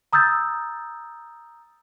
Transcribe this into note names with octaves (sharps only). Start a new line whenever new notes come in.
A#5 D#6 E6 G6 A6